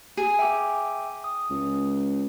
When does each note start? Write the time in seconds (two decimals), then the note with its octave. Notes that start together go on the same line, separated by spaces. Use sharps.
0.17 G#4
0.39 E5 G5 D6
1.24 D#6
1.50 C#2